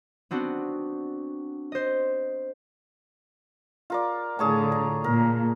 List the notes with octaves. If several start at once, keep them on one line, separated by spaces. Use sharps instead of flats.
B3 C4 D4 F#4
C5 D#5
F4 A#4 D5
A2 D3 G#4 C#5 A5
A#5
A#2 A#4